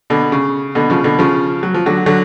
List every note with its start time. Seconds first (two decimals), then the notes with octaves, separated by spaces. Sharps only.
0.10 B2 D3
0.32 C#3
0.75 B2 D3
0.90 C#3 F3
1.04 B2 D3
1.19 C#3 F3
1.63 F#3
1.74 F3
1.86 D3 F#3
2.06 D3 F#3